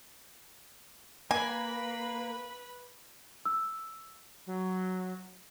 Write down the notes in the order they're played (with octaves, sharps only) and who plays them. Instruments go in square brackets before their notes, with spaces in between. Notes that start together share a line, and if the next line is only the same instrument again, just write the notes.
[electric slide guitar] A#3 [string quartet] B4 B5 [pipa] G#5
[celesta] E6
[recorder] F#3